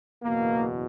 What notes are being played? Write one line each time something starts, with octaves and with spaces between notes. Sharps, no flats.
F#1 E2 B2 A#3